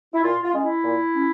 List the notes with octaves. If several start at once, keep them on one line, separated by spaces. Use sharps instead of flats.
E4
A#2 F4
F4
G#3 C#4
E4
A#2
C#4